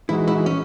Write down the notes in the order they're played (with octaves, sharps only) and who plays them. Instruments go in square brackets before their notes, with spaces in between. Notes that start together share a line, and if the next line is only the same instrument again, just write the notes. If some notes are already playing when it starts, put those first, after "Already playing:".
[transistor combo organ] E3 G#3 D#4 F#4 [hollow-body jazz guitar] E4
[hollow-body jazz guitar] E4
C#4